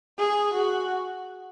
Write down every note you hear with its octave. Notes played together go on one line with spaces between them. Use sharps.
G#4
F#4